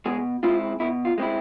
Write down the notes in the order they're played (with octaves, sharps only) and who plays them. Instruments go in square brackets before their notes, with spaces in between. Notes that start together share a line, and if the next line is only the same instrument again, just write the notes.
[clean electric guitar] B2 G#3 G#4
G#3 C4 E4 F4
B2 E4
F4
G#3 C4 E4